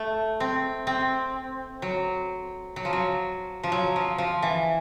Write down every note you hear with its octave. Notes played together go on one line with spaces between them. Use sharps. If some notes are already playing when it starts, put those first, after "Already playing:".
Already playing: A3
C4
C4
F#3
F#3
F3
F#3
F3
F#3
F3
F3
E3